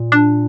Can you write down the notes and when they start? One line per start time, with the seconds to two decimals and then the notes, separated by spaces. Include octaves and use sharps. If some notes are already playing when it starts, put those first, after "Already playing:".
Already playing: A#2
0.12 D4